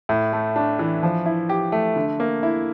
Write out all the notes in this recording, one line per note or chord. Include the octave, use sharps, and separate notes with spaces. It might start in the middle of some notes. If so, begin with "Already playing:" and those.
A2
A3
D4
E3
F3
E4
G4
A3
D3
A#3
E4